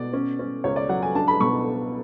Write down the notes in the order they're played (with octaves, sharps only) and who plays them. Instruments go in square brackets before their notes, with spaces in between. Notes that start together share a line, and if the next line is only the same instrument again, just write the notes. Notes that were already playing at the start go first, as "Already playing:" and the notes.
Already playing: [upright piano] B2 D5
C#4
C#4
C#2 C#5
D5
F#3 F#5
G#5
D4 A5
B5
B2 C#6